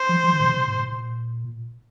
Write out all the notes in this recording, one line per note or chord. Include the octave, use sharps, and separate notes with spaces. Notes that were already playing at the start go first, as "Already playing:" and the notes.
Already playing: C5
F3
F3
D#3
A#2
C3
C3
A2
A#2